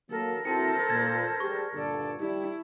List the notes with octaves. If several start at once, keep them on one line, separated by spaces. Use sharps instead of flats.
F#3 A#3 A4 A#4
C4 E4 F#4 A4 C5 A5 C#7
A#2 G#6 A6
G3 G4 G#4 C#6
G2 A#2 D3 A4 D5
G3 E4